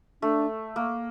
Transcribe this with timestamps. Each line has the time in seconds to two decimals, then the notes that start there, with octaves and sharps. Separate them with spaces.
0.22 A3 D4
0.76 A#3